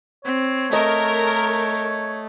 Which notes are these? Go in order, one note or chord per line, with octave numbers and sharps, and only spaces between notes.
C4 C#5
A3 A#4 D#5